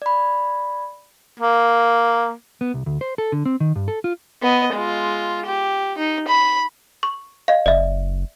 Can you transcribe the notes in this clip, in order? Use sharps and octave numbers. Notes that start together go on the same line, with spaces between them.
D5 B5
A#3
B3
C2
D2
C5
A4
D3
C4
D#3
G2
A4
F4
B3 D#5
G#3 F4
G4
D#4
B5
C#6
D#5 F5
F#1 D5 E5